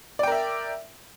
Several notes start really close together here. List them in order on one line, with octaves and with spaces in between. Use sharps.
D5 G5 A#4 E5